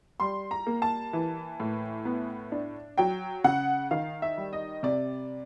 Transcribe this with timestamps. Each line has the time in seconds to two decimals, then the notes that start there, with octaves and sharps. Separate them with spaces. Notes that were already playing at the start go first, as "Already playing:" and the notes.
0.20 G3 C6
0.51 A#5
0.67 A#3
0.82 A5
1.13 E3
1.60 A2
2.05 B3
2.52 D4
2.98 F#3 G5
3.44 C#3 F#5
3.91 D#3 F5
4.22 E5
4.38 G3
4.53 D#5
4.83 C3 D5